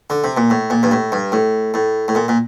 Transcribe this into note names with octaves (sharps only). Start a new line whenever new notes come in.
D3
C3
A#2
A2
A#2
G2
A2
G2
A2
A2
A2
A#2
A#2